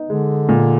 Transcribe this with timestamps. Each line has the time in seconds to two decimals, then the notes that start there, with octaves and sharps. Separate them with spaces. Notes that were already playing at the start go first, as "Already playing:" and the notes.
Already playing: B3 D#4
0.09 D3 G#3
0.49 A#2